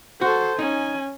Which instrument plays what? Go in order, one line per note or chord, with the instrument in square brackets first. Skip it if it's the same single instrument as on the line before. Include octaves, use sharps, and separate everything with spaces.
[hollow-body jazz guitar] F#4 [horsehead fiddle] A4 C5
[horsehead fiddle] C#4 G#5 [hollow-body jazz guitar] D#4